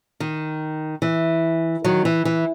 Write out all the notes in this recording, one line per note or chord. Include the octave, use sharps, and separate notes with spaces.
D#3
E3
D#3 F#3
E3
E3